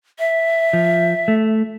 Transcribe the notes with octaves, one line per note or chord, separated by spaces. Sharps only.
E5
F3
A3